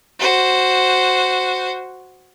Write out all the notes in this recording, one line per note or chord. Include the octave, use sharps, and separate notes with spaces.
F#4 C5